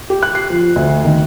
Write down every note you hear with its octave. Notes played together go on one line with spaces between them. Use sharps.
G4
F#6
C7
F3
D2
D#3